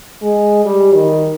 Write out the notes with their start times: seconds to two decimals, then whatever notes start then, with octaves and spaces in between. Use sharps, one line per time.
0.23 G#3
0.65 G3
0.93 D#3